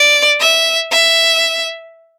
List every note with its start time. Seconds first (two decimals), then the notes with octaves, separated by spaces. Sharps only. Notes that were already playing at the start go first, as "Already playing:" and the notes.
Already playing: D5
0.40 E5
0.91 E5